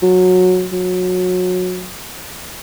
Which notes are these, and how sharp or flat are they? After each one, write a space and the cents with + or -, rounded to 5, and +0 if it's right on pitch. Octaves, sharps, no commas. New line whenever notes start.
F#3 -15
F#3 -25